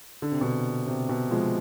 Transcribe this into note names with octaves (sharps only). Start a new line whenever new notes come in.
D3
C3
B2 D3
C3
B2
F3 G#3